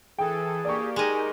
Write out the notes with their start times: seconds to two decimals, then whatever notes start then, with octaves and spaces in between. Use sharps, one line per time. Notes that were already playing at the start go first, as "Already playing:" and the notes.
0.19 E3 G#4 A4 G5
0.65 A#3 G4 D5 C#6
0.96 G#3 D#4 G4 A#4 D#5 G#5